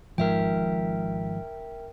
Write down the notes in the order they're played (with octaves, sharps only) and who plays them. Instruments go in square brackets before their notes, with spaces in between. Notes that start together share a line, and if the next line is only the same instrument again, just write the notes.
[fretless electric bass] G#1 G#2 F3 [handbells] A#4 E5 G5